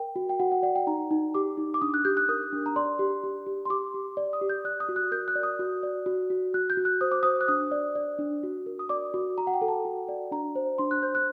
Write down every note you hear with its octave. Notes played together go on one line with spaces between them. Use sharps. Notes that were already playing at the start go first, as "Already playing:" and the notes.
Already playing: A#4 G5
F#4
G5
F#4 F#5
F#5
D5 F#5
G5
D#4 A#5
D#4
G4 D6
D#4
D6
D4 D#6
F#6
G4 G6
F#6
A#4 D#6
D4
A#5
D5 C6
G4
G4
G4
C6
G4 D6
G4
D5
D#6
G4
G6
D5 F#6
D#6
F#4
F#6
A#4 G6
F#6
D5
D#6
F#4
D5
F#4
F#4
F#4 F#6
G6
F#4
F#6
C5 D#6
D6
C5 D#6
F#6
D4 D#6
D5
D5
D4
F#4
A#4
D#6
D5 D6
F#4
F#4 A#5
F#5
G5
A4
A5
F#4
D5
D4 A#5
C5
D4 C6
F#6
C5 G6
F#6